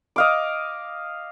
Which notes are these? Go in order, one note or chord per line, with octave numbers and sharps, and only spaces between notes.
D#5 F5 D6